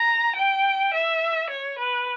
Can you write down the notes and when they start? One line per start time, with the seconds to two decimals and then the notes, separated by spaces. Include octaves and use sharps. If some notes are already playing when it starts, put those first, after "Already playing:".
Already playing: A#5
0.36 G5
0.93 E5
1.50 C#5
1.79 B4